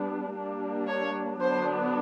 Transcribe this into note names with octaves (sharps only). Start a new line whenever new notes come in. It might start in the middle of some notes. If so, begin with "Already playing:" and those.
Already playing: G3 B3 D4
G3 A#3 D4
C#5
D3 F#3 B3 D4 C5